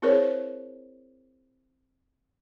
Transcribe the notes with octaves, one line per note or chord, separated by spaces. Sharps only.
C4 E4 G#4 A#4 C5 C#5